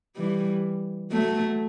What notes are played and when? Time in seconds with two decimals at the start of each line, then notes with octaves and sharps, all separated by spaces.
0.16 E3 G3
1.11 F#3 A3